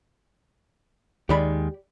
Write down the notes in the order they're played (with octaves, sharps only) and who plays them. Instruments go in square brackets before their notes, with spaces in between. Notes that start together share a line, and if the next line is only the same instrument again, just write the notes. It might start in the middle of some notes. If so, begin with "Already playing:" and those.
[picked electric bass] D#2 D#3 G#3 [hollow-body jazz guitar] G4 D5 B5